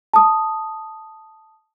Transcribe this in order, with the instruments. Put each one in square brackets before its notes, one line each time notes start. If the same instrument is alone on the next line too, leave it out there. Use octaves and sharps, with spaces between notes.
[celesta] A5 D#6